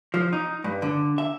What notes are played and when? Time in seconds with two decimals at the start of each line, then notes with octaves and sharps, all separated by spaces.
0.14 F3
0.33 D#4
0.64 G2
0.82 D3
1.18 E5